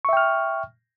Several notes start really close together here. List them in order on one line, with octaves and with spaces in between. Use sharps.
C#6 E5 G5 F6